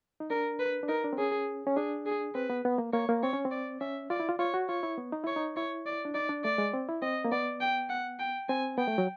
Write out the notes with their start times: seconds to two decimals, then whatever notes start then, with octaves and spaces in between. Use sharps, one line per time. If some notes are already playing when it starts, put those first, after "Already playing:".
0.20 D#4
0.30 D4 A#4
0.60 B4
0.83 D4
0.88 D#4 A#4
1.04 D4
1.13 C4
1.18 C#4 G#4
1.67 C#4
1.77 D4 G#4
2.06 G#4
2.35 C4 B4
2.50 B3
2.65 B3
2.78 A#3
2.93 A#3 C#5
3.09 A#3
3.23 C4 C#5
3.33 C#4
3.45 C4
3.51 D5
3.81 C#4 E5
4.10 F4 D5
4.20 E4
4.29 F4
4.39 F4 C#5
4.54 F#4
4.69 F4 C#5
4.83 E4
4.98 B3
5.12 D#4
5.24 E4 C#5
5.36 D#4
5.57 E4 C#5
5.86 D5
6.05 D4
6.15 D#4 D5
6.29 D4
6.44 A3 D5
6.58 G#3
6.73 C4
6.89 E4
7.02 C4 D#5
7.25 A#3
7.32 B3 D5
7.61 G5
7.90 F#5
8.19 G5
8.49 C4 G#5
8.78 B3 G5
8.88 A3
8.98 F#3